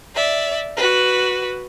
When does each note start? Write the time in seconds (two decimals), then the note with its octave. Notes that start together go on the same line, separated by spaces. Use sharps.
0.15 D5 E5
0.76 F#4 B4